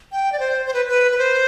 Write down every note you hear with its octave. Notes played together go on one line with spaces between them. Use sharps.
G5
D5
C5
C5
B4
B4
B4
C5